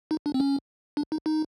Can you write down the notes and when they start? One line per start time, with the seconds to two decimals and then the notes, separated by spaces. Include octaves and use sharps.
0.11 D#4
0.26 D4
0.34 C4
0.40 C#4
0.97 D4
1.12 D#4
1.26 D#4